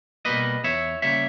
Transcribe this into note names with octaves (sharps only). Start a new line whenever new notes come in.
B2 G3 A#3 B4 D#5
E2 C#5 E5
C#3 G3 A#3 C#5 E5